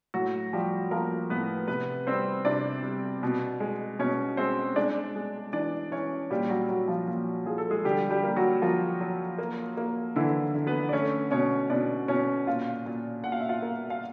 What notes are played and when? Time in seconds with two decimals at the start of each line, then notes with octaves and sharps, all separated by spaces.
0.14 A2 F#3 F#4
0.53 F3 G3 G4
0.91 F3 A#3 A#4
1.30 A2 B3 B4
1.68 C3 B3 B4
2.06 G3 C4 C5
2.45 C3 D4 D5
2.83 G3
3.23 B2
3.60 G#3
3.99 B2 C#4 C#5
4.37 G#3 C4 C5
4.76 G#3 D4 D5
5.16 G#3
5.53 E3 D4 D5
5.91 E3 C#4 C#5
6.31 A#2 G3 G4
6.49 F#3 F#4
6.69 A#2 F#3 F#4
6.88 F3 F4
7.07 A#2
7.46 F3 G#4
7.58 A4
7.71 G#3 G#4
7.84 D3 G3 G4
8.10 G3 G4
8.23 A#3
8.36 F#3 F#4
8.62 F3 A#3 F4
9.01 F#3
9.38 A#3
9.77 A#3
10.16 D3 E3 E4
10.55 D3
10.67 B3 B4
10.89 D5
10.93 A3 C#4 C#5
11.31 B2 C#4 C#5
11.70 B2 D4 D5
12.08 B2 C#4 C#5
12.46 A#2 F4 F5
12.86 A#2
13.23 A#2 F#5
13.32 F5
13.40 E5
13.49 F4 F5
13.62 A#3
13.90 F5